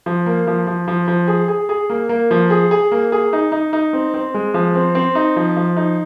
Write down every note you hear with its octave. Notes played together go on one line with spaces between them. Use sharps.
F3
A#3
F3
F3
F3
F3
G#4
G#4
G#4
A#3
A#3
F3
G#4
G#4
A#3
G#4
D#4
D#4
D#4
C4
C4
G#3
F3
C4
C4
D#4
F3
F3
D#4